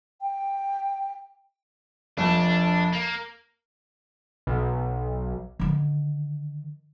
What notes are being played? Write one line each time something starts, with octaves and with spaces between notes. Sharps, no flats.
G5
F1 F2 D4
A#3
B1
D3 D#3